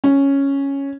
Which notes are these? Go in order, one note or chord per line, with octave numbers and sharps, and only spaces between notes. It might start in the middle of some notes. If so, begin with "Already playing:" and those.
C#4